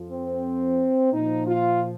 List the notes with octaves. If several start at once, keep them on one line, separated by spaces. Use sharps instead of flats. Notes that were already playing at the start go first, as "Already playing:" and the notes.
Already playing: F2 F3
C4
A#2 F3 D#4
F4